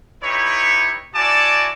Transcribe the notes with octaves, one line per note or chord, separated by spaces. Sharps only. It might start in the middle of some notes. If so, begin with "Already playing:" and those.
D#4 E4 G4 B4 C#5
E4 F#4 D5 G#5 A5 D6